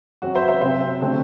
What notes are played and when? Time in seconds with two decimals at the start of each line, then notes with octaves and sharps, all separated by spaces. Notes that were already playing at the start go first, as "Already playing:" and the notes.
0.22 F#2 F#3 C4 F#4
0.35 C5 E5
0.48 C5 E5
0.61 C3 F#3 C4 C5 E5
1.01 D3 A3 C4